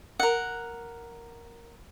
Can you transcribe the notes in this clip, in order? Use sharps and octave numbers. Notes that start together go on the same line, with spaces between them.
A#4 F#5